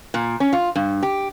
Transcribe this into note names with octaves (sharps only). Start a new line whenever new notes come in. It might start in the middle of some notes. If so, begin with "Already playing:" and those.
A#2
C#4
F4
G2
G4